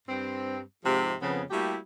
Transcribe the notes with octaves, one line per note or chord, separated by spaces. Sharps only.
G2 C4
G#2 C3 F3
F2 C#3 B3
G3 A3 A#3 E4 F#4 G4